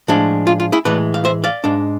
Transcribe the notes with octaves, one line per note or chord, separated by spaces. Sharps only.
A2 F3 G#3 D4
F4
F4
E4 G#4
A2 E3 G#3 B4 D5
F5
C5 E5
D5 F5
G#2 G#3 D4